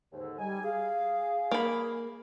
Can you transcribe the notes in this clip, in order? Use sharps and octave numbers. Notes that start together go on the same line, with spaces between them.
D#2 G#2 D3
G3 D#4 G#5
G#4 F5
A#3 B5